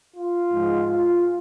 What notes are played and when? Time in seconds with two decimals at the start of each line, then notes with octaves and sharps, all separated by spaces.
0.16 F4
0.52 G#2 F3 G#3
0.88 F4